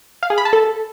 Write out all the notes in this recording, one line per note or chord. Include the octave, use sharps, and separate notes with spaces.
F5
G#4
B5
A5
A4